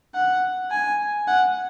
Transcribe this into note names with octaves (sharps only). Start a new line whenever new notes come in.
F#5
G#5
F#5